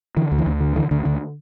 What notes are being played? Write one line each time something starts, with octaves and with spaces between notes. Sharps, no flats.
D3 E3
D2
E3
D2
D3
D3 E3
D2 D3
D2 D3